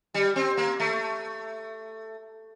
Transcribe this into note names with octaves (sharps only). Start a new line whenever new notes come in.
G3
C4
A#3
A3